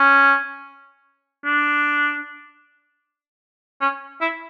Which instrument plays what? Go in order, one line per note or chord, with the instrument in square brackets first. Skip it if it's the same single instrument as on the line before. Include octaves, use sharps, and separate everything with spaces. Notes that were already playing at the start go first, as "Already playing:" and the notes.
Already playing: [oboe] C#4
D4
C#4
E4